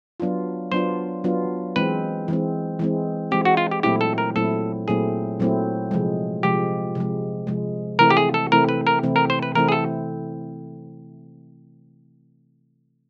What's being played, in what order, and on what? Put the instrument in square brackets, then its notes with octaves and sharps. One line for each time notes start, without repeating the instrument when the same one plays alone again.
[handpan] F#3 B3 D4 F4
[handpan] F#3 B3 D4 F4 [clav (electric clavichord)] C5
[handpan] F#3 B3 D4 F4
[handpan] E3 G#3 C4 [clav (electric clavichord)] B4
[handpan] E3 G#3 C4
E3 G#3 C4
[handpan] E3 G#3 C4 [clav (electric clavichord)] G4
[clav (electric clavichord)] F#4
F4
G4
[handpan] A#2 F#3 A3 C4 E4 [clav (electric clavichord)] G4
[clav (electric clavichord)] A4
A#4
[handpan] A#2 F#3 A3 C4 E4 [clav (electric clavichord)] A4
[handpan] A#2 F#3 A3 C4 E4 [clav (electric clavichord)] G#4
[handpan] A#2 F#3 A3 C4 E4
C3 F3 G#3
[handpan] C3 F3 G#3 [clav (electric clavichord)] G4
[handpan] C3 F3 G#3
C3 F3 G#3
[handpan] C3 E3 A3 C4 E4 [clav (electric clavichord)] A#4
[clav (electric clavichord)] G4
G#4
A4
[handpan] C3 E3 A3 C4 E4 [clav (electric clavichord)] A#4
[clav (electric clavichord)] B4
A#4
[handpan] C3 E3 A3 C4 E4
[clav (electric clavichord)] A#4
C5
B4
[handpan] C3 E3 A3 C4 E4 [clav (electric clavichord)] A#4
[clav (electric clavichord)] G#4
A4